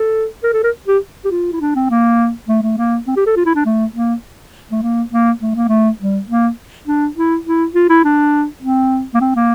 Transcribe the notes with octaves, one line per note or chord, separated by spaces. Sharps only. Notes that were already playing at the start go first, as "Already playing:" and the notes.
Already playing: A4
A#4
A4
A#4
G4
G4
F4
E4
D4
C4
A#3
A3
A3
A#3
C4
G4
A4
F4
E4
D4
A3
A#3
A3
A#3
A#3
A3
A#3
A3
G3
A#3
D4
E4
E4
F4
E4
D4
C4
A#3
C4
A#3